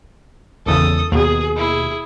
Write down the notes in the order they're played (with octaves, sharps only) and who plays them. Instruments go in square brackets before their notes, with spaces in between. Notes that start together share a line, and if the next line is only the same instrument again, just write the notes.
[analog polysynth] G#1 E2 C#3 [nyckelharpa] A4 D#6
[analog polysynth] D#2 B2 [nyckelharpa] G#4
[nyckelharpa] E4 G#4